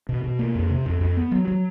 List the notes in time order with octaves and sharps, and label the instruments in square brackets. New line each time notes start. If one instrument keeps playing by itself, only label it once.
[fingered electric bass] B2
B2
A#3
F2
C3
F2
F2
B3
F#3
F#3